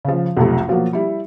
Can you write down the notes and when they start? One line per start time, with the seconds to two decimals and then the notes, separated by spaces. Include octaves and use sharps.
0.05 C#3 F3
0.37 B1 F2 C3 A3
0.68 B2 F3 F#3 A#3
0.93 G3 E4